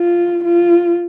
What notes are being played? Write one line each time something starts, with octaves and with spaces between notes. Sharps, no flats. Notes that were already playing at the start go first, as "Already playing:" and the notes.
Already playing: F4
F4